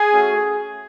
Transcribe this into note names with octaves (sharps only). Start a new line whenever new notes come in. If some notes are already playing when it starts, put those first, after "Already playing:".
Already playing: G#4
A3 C#4 F#4